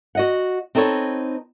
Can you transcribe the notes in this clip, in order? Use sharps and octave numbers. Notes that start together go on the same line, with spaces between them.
F#4 D#5 F#5
C4 D#4 A4 B4 C#5